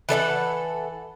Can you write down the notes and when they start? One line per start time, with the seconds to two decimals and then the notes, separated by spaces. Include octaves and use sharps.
0.09 E3 A4 C#5 F#5